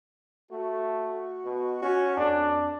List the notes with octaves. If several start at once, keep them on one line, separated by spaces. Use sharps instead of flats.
A3 F#4
B2
C#4 F#4
F2 D4